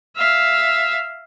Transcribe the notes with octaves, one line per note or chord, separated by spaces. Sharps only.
E5 F5